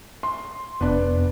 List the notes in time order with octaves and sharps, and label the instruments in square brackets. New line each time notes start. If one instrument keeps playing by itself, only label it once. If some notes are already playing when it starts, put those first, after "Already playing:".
[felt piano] C6
[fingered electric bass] F1 [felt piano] B3 D4